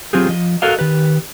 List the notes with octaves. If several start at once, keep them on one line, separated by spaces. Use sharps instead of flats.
F#3 C4 F4 G4 G#4
F3 D#5
F#4 A4 A#4 D#5 F5
D#3 G4 B4